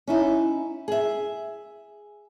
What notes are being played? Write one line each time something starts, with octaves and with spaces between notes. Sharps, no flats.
C#4 D#4 E4
G#4 E5